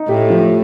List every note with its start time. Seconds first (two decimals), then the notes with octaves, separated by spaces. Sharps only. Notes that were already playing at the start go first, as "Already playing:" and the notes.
Already playing: D#4
0.09 A2 G4
0.30 F3